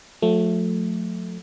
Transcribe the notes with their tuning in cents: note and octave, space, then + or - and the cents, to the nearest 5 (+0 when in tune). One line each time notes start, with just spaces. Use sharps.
F3 +45 A3 +0